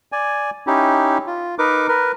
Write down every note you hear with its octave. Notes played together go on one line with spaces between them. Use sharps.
D5 G#5
C#4 D#4 E4 G4
F4
D#4 A#4 B4 D6
A#4 B4